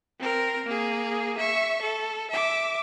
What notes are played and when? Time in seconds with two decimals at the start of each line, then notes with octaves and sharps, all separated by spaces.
0.20 C4 A#4
0.66 A#3 G#4
1.38 E5 C#6
1.82 A4
2.31 E5 D6